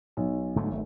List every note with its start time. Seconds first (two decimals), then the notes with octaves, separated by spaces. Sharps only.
0.17 B1
0.56 G#2 D3 A3
0.71 G#1 A3